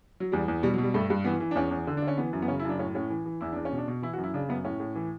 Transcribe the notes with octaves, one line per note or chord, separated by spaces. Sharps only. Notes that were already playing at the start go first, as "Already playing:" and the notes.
F#3
E2 G3
E2
B2 G3
F#3
B2
G3
G2 A3
G2
E3 B3
E3
D4
E2 C#4
E2
D3
D4
D3
C#4
E3 B3
F#2
B3
C#3 C#4
E4
F#2 D4
A2 C#4
A2 C#4
E3
E3
E2 E4
E2 D4
C#4
B2
D4
B2
E3 E4
F#4
F#2
E4
C#3 D4
F#2 B3
A2 C#4
A2
E3